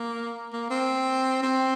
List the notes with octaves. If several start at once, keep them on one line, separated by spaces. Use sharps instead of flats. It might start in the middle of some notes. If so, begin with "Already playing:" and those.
Already playing: A#3
A#3
C4
C4